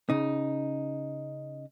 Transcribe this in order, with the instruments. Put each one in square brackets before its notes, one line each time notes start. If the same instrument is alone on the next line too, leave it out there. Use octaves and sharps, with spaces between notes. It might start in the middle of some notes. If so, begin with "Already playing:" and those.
[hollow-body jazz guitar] C#3 D#4